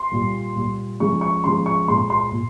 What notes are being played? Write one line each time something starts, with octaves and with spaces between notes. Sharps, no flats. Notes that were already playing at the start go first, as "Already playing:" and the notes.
Already playing: C6
A#2 G3
A#2 G3
C#3 F3 G#3 C#6
C#6
C#3 F3 G#3 C6
C#6
A#2 G#3 C6
C6
A#2